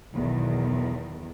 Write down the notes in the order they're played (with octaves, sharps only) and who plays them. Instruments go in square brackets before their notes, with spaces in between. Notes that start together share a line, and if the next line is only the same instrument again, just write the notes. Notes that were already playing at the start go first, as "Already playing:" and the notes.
[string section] B1 E2 D#3